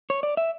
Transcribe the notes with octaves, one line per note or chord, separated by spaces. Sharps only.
C#5
D5
E5